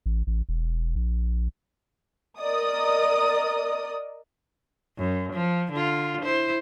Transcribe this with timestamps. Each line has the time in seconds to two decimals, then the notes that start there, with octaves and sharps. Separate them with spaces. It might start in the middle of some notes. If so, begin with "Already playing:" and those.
0.06 A1
0.27 A1
0.49 E1
0.96 A#1
2.39 A#4 D5 D#5 D#6
4.98 F#2
5.33 F3
5.72 D3 F4
6.21 E4 C5